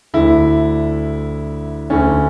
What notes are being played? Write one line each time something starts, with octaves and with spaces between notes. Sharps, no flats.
D2 D3 E4
D2 D3 C#4